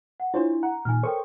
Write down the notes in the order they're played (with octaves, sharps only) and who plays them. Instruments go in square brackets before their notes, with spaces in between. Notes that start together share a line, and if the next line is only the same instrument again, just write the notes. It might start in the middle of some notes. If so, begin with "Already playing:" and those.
[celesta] F#5
[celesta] D4 E4 [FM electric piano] F4 C5 C#5
[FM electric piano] F#5 [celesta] A#5
[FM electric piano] A#2 D#3 [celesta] G#5 F6
[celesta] A4 A#4 G5 [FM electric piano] C5 C#5 C#6